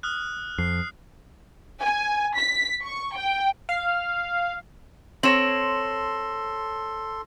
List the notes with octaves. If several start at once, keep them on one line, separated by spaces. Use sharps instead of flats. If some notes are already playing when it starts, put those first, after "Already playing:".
D#6 F6 F#6
F2 C7
G#5
B6
C#6
G5
F5
C4 A4 C#5 C6 A#6 E7 F#7